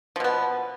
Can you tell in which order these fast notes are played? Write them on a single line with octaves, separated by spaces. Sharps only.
F3 B2 B3